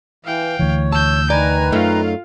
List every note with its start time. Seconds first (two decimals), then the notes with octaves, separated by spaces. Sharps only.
0.25 E3 F5 G5
0.59 D2 E3 C#5
0.93 A5 E6 G6
1.30 D#3 B4 D5 G#5 A#5
1.72 F#2 A3 D#4 F4 F5